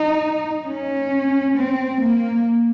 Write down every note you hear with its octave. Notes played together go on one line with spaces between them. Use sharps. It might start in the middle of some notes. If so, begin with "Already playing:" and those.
Already playing: D#4
C#4
C4
A#3